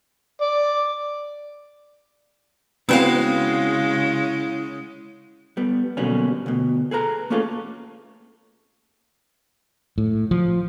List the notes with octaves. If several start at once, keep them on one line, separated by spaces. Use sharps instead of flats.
D5
C#3 G#3 B3 C4 E4 F#4 F5
G3 B3
B2 D3 F#3 G3 A#3 C#4
D2 B2
G#4 A4 B4 A#5
A3 A#3 C#4 F4 G#4 A4
A2
F3